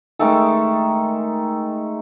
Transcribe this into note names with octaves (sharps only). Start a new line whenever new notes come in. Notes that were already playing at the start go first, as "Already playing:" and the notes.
D#3 G#3 A3 A4